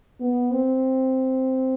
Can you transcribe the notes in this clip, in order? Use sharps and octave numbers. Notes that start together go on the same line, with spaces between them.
B3
C4